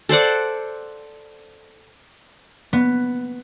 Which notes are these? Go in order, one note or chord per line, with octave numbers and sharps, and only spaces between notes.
A4 C5 D5 F#5
B3